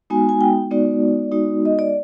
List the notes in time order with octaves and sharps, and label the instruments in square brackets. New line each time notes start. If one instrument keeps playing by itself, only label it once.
[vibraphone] G#3 B3 D#4 F#4 G#5
G#5
G5
G#3 B3 D#4 F#4 D5
G#3 B3 D#4 F#4
D#5
D5